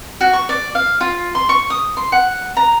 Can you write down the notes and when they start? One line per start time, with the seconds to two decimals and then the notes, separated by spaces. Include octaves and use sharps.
0.21 F#4
0.33 C#6
0.49 D5
0.75 F5
1.01 F4
1.35 C6
1.49 C#6
1.70 D#6
1.97 C6
2.12 F#5
2.57 A#5